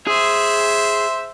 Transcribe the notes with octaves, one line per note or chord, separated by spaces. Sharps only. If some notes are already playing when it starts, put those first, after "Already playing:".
G#4 C5 E5